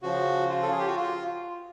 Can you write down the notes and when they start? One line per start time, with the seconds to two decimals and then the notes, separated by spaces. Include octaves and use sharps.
0.02 C#3 F3 F#4
0.49 F4
0.62 A4
0.71 G#4
0.79 G4
0.87 F#4
0.96 F4